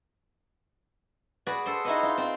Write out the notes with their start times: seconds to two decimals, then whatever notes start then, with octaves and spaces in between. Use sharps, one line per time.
1.47 F#4 G#4 B4 D5
1.66 G#4 A4 C5
1.85 D#4 E4 F#4 B4 C5 D#5
2.03 D#4 F4
2.18 C4 F4